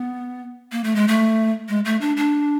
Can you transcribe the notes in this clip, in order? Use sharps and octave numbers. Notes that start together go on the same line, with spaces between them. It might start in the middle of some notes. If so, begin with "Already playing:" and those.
Already playing: B3
A#3
A3
G#3
A3
G#3
A3
D4
D4